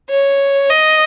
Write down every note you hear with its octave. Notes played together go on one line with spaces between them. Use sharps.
C#5
D#5